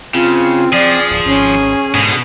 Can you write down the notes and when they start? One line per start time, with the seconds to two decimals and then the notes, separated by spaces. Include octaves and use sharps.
0.14 C#3 C4 F4
0.73 F3 G#4 D5
1.11 D1
1.26 G#1 C#4
1.95 G#2 B2 D3 G#4